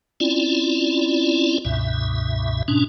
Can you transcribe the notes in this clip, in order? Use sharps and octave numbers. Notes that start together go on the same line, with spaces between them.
C4 C#4 E4 F4 D5
C#2 G2 B2 E5
G#2 B2 C#4 D4